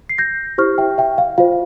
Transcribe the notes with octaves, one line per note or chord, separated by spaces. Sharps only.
C7
G6 A#6
E4 G4 C5 C#6 F6
E5 G5
E5 G5
F5
F4 C5 F5